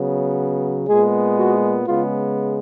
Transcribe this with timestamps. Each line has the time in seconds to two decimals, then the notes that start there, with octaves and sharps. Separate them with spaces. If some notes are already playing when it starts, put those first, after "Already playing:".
Already playing: C#3 F#3 B3
0.88 A#2 G#3 B3 G#4
1.38 F#4
1.87 C#3 G#3 B3 F4